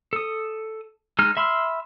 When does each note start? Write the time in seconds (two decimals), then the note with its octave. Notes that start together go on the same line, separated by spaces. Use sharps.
0.13 A4 D#6
1.19 G#3 D#4 F6
1.37 E5 B5 C6 E6 F6